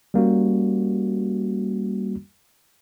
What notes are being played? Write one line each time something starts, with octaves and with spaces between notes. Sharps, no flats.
G3 A#3 C#4 F#4